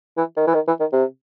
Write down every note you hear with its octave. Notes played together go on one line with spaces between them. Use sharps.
E3
D#3
E3
D#3
E3
D#3
C3